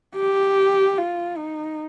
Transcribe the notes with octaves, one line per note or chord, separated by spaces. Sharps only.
G4
F4
D#4